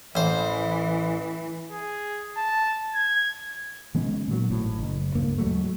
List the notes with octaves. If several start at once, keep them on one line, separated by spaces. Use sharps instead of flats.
A1 E3 C5
G#4
A5
G#6
D#3 G#3 B3 C#4
A#2 D#3 F#3
G#1 A2
F#1
C#2 G2 A#3
D#2 G#2 F#3 A3